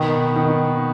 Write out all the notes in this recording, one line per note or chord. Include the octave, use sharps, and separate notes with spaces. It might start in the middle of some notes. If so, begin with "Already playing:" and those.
Already playing: B2 D#3
D#3